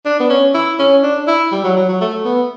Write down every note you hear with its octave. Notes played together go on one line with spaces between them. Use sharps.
D4
B3
C#4
E4
C#4
D4
E4
G3
F#3
F#3
F#3
A3
B3